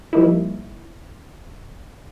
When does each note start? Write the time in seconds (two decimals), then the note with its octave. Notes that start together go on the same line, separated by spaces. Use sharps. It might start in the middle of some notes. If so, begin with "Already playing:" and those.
0.13 F3 G3 A#3 D#4 E4